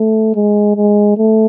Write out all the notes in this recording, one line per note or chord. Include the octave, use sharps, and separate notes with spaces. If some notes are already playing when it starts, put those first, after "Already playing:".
Already playing: A3
G#3
G#3
A3